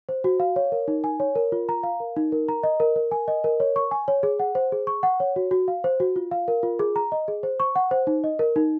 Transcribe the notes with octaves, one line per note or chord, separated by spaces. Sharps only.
C5
F#4
F5
C#5
A#4
D#4
G#5
C#5
A#4
F4
A#5
F5
A#4
D#4
A#4
A#5
D#5
A#4
A#4
G#5
D#5
A#4
C#5
C#6
G#5
C#5
G#4
F#5
C5
G#4
C#6
F#5
C#5
F#4
F#4
F5
C5
F#4
F4
F5
A#4
F4
G#4
A#5
D#5
G#4
C5
C#6
F#5
C5
D#4
D#5
A#4
D#4